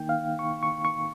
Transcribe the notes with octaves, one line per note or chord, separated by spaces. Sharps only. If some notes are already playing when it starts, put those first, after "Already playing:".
Already playing: D#3 A#3 D#4 G5
F5
C#6
C#6
C#6